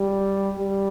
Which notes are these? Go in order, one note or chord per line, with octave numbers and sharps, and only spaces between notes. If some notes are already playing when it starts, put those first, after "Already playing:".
Already playing: G3
G3